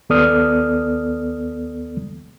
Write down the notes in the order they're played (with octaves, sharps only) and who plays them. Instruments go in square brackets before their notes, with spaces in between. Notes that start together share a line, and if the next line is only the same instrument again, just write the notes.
[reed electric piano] D#2 B3 A4 D5 D#6 F6